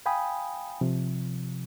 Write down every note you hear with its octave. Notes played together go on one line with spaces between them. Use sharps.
F5 G5 G#5 B5 D#6
C3 F3